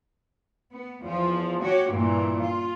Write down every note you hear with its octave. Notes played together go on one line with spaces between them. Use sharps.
B3
E2 F3
F#4 G4 C#5
G2 A#2 E3
F4